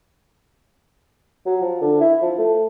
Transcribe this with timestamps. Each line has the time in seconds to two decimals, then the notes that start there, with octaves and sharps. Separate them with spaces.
1.46 F#3
1.62 F3
1.81 D3
2.01 E4
2.21 F3
2.38 A3